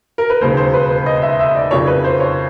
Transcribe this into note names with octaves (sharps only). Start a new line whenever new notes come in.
A#4
B4
E1 D#2 C#3 F#3 C5
C5
B4
B4
D#5
E5
E5
D5
F2 C#3 F#3 A#3 C#5
B4
C5
C#5